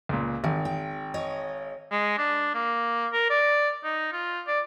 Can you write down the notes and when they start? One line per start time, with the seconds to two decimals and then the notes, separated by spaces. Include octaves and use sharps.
0.09 C#2 A#2
0.44 G#1 D#3
0.65 G5
1.14 C#5 D#5
1.91 G#3
2.18 D4
2.54 A#3
3.13 A#4
3.30 D5
3.84 D#4
4.13 F4
4.47 D5